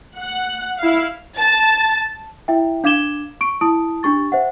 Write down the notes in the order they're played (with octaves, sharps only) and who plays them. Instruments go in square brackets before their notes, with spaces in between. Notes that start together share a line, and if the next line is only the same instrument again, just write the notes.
[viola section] F#5
E4 F5
[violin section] A5 A6
[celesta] E4 E5 G5
D4 F5 D6 G#6 E7 G7
C#6 D7
E4 A5 D#6 D7
D4 G4 C#6 A6
C5 E5 F#5